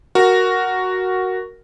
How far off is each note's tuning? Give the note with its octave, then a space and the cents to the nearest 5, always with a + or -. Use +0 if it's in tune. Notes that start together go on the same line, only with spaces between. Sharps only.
F#4 +0 A#4 +0